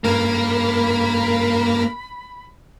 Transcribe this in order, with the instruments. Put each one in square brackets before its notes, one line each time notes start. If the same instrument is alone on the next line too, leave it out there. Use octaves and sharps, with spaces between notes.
[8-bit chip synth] G2 A#4 [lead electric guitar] A#3 [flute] B5